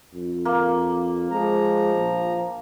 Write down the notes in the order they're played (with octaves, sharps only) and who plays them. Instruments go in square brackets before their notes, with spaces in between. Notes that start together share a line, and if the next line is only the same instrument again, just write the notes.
[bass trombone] F2
[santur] A#3
[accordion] F3 A#5 [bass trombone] G#3
[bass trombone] A#1